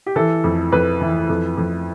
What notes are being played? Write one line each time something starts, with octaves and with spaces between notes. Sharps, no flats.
G4
E3 A4
F2
F2 B4
E3
F2
F2